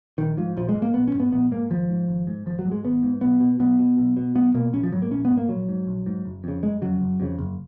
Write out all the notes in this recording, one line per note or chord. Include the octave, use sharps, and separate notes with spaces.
A#1 D#3
G#2 F3
A#1 F3
G#3
G#2
A#3
A#1 B3
C#4
G#2
B3
A#1 B3
G#2 A#3
G#1 F3
G#2
G#1
G#2
G#1 F3
F#3
G#2
G#3
G#1 B3
G#2
B1 B3
B2
B1 B3
B2
B1
B2
B1 B3
B2 A#3
A#1 C#4
F3
G#2 F#3
A#3
A#1 C#4
B3
G#2
A#3
A#1 F#3
G#2
A#1
G#2
F#1
F2 C#3
F#1 G#3
F2 C#3 F#3
F#1
F2 C#3
F#1